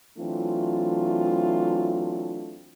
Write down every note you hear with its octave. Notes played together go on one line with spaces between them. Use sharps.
E3 F#3 A3 C4 D4 F4